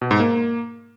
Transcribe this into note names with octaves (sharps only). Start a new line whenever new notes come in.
B2
G#2
A#3